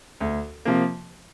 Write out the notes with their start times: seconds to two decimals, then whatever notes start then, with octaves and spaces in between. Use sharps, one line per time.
0.21 D2
0.65 C3 F3 A#3